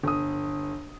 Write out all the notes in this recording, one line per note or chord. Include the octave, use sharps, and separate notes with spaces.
G1 D#6